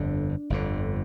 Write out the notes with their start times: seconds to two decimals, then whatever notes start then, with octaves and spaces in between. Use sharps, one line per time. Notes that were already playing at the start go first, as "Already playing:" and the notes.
Already playing: G1 F2 D3 D4
0.50 G1 F2 D3